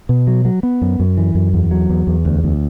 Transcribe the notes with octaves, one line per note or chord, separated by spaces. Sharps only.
B2
F#3
F#3
B3
F#2
F#2
E3
F#2
E2
F#3
E2
E2
D2
D2